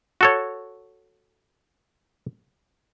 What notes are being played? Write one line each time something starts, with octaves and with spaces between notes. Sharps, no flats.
F#4 A4 C#5